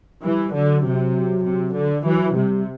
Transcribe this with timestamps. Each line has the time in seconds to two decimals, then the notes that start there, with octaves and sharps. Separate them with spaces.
0.24 E3 G3
0.54 D3 F#3
0.85 C3
1.45 C3
1.75 D3
2.05 E3 F#3
2.36 C3 G3